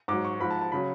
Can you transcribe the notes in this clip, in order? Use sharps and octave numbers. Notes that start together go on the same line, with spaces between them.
G#2 F#3 D6
C#6
G#2 F3 B5
A5
A5
C#3 F#3 B5